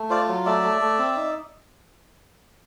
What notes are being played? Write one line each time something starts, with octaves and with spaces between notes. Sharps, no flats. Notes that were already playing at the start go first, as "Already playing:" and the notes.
Already playing: A3
F4 C5 D5
F#3
A3 D5 E5
A3
A3
C4
D#4